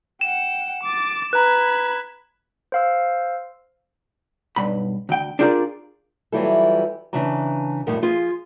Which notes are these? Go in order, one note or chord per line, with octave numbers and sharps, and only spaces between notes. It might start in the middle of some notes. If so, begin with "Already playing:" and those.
F#5 G5 E7
D6 A6
B4 A#5 B5 F#6 G#6
C5 F5 E6
B1 G2 B5
D2 G5
D4 F4 G4 G#4 A#4 D5
E3 F#3 G3 E4 F4 A4
C#3 E3 D4 A5 A#5
F2 A2 D#3 F3 G3 A5
F3 F4 G#4